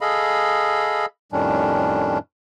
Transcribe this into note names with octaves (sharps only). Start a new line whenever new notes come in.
G#4 A4 D#5 F5 B5
F2 A2 D#3 G3 C#4 D4